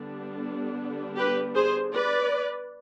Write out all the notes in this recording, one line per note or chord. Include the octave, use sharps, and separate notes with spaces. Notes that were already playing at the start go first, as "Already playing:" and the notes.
Already playing: D3 G3 B3 D4
G4 B4
G#4 C5
B4 D5